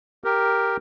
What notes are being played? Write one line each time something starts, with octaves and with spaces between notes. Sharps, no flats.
G4 A#4